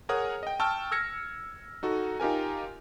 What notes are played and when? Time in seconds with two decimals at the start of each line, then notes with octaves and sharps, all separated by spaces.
0.09 G#4 A#4 C#5 F#5 D#6
0.43 D#5 G5
0.60 G5 A5 C#6 E6 F6
0.92 E6 F6 G#6 A#6 C#7
1.83 D#4 F#4 A4
2.20 D#4 F4 G4 A#4 G#5